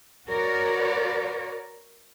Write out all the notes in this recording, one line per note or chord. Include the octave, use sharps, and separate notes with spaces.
F#4 A#4 B4 C#5 D5